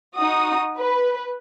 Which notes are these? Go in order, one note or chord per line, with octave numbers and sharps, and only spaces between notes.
D#4 F#4 D#6
B4